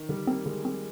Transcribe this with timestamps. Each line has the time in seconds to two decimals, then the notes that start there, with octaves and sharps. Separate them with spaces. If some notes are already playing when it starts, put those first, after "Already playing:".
Already playing: D#3
0.09 D3 G3
0.27 A#3 C4
0.46 D3 G#3
0.64 G3 C4